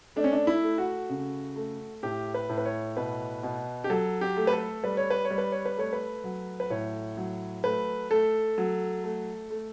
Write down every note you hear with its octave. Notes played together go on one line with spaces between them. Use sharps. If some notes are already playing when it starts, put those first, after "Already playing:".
A3 D4
C#4
D4
E4
A3
F#4
C#3
A3
A2 G4
B4
A2
B4
C#5
B2 B4
B2
G4
F#3 A4
G4
A3
B4
A4
G3 B4
C#5
B4
C#5
G3
B4
C#5
B4
A3 C#5
B4
F#3
B4
A2 C#5
F#3
A3 B4
A3 A4
F#3
A3
A3